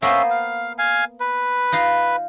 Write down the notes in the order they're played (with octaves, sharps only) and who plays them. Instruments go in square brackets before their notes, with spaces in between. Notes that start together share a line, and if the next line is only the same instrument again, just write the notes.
[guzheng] A#3 B3 C5 [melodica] C#4 E5
[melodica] F5
F5 G#5
B4
[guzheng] D#4 F4 F5